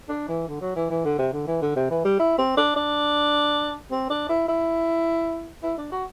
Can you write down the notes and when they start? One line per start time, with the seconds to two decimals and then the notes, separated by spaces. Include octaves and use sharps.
0.09 D4
0.28 E3
0.47 D3
0.61 F#3
0.76 E3
0.90 E3
1.05 D3
1.19 C3
1.33 D3
1.47 E3
1.62 D3
1.76 C3
1.91 E3
2.05 G3
2.19 E4
2.38 C4
2.57 D4
2.76 D4
3.91 C4
4.10 D4
4.29 E4
4.48 E4
5.63 E4
5.78 D4
5.92 F#4